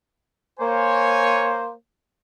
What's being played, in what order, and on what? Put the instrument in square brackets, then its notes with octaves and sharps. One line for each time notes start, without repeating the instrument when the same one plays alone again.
[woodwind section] A#3 C5 [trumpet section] C#5 G#5